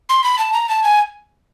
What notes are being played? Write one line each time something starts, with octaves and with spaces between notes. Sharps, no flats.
C6
B5
A5
A#5
A5
G#5